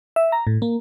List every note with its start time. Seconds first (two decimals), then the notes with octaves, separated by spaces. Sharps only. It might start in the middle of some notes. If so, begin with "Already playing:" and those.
0.16 E5
0.32 A#5
0.47 A2
0.62 A#3